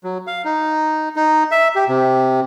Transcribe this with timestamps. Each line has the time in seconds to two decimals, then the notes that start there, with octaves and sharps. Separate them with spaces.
0.04 F#3
0.27 F5
0.45 D#4
1.16 D#4
1.51 E5
1.76 G4
1.88 C3